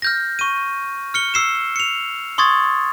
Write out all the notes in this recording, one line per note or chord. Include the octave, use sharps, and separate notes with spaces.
F6 G6 A#6
C#6 D#7
F6 C#7 G7
E6 C7 E7
C#7 F7
C6 C#6 D#6 G#6 A6